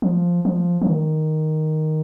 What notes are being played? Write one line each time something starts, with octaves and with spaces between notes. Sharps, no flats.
F3
F3
F3
D#3